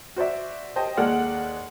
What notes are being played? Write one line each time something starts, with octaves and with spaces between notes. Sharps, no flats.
F#4 C5 D5 E5
G4 C5 D#5 G5 A5
D#2 G#3 A4 D5 F#5 F6